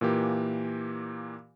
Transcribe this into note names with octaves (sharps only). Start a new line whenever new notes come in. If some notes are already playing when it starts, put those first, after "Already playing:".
A#2 E3 A#3 G4